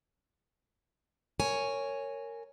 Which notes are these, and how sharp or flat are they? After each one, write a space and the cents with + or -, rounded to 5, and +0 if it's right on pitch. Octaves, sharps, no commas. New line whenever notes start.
A#4 -15 C#5 +0 G#5 +0